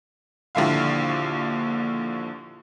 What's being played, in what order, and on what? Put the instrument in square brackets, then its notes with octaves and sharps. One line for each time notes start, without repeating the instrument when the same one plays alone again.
[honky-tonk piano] A#1 D#2 D3 E4 F5